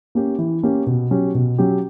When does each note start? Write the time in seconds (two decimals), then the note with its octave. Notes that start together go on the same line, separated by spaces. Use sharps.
0.15 A#3 C#4 G4
0.39 E3
0.63 A#3 C#4 G4
0.86 B2
1.11 F#3 C#4 G4
1.34 B2
1.58 F#3 C#4 G4